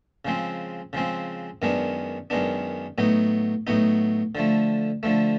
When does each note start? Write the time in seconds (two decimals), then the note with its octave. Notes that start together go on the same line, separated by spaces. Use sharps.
0.25 C#3 F3 G#3 C4
0.93 C#3 F3 G#3 C4
1.62 F#2 D#3 G#3 B3 D4
2.30 F#2 D#3 G#3 B3 D4
2.98 A2 F#3 B3 D#4
3.67 A2 F#3 B3 D#4
4.35 D3 F3 A3
5.03 D3 F3 A3